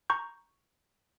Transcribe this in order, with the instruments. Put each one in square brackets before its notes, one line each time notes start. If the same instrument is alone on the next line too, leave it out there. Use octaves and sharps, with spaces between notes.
[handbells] A#5 C#6 G6